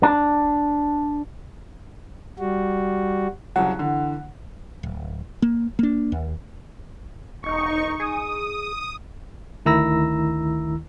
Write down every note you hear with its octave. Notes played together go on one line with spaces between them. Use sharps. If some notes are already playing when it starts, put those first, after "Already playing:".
D4
G3 F#4
C2 C#3 F#3 F#5
D3 E3
D1
A#3
A#3 D4
D#2
E1 D#4 C#6
G#4 D#6
D2 D#3 E4 A#5 E6 A#6